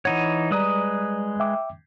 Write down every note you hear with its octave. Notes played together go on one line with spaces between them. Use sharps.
E3 D#4 C#5 F#5
G3 G#3 B4 D5 A#5 D#6
E5 G5 D6